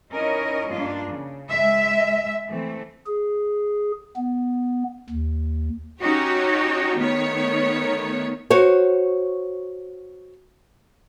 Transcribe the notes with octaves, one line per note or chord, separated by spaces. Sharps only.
C#4 D#4 E4 A#4 C#5 D#5
G2 A#3 D4 F4
C#3
G#3 E5
E3 A3 C4
G#4
B3
D#2
C#4 D#4 F#4 G4 C#5
D#3 A3 B3 C#5
F#4 C5 C#5